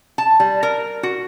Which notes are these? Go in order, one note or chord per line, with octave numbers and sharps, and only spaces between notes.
A5
G3
A#4
F#4